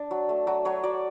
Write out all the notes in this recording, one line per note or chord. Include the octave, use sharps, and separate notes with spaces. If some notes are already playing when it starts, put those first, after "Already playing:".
Already playing: D4
F#3
A3
F#3
F#3 C#5
F#3 D5